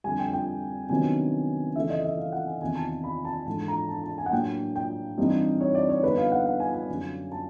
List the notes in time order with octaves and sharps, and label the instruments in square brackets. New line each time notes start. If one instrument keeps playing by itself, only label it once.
[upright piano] F2 D3 G3 G#5
G5
G5
C3 D#3 F#3 B3 D4 G#5
C#3 E3 A3 E5
D#5
E5
F5
F#5
G#5
E2 C3 D#3 G#5
A5
B5
A5
G#2 E3 A3 D4 A5
A#5
A5
A5
G#5
F#5
A2 F#3 A#3 D4 G5
G5
G2 E3 G3 C4 D#4
C#5
D5
C#5
D3 G3 B3 D#4 B4
F5
F#5
F#5
G#5
G#5
F#2 D3 F#3
A5